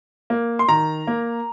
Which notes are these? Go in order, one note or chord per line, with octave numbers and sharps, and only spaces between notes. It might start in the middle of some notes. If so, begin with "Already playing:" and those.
A#3
C6
D#3 A#5
A#3